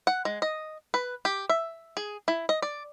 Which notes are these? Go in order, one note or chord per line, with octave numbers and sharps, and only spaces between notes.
F#5
G#3
D#5
B4
G4
E5
G#4
E4
D#5
D5